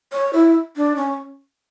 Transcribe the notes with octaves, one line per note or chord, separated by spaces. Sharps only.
C#5
E4
D4
C#4